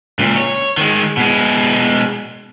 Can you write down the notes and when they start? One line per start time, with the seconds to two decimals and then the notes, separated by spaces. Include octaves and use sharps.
0.19 C#2 A#2
0.36 C#5
0.77 D#3 G#3
1.17 B2 G#3